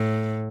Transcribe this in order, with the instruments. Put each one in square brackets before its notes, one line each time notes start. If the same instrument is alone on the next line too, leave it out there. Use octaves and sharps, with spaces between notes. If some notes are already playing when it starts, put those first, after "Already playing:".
Already playing: [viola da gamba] A2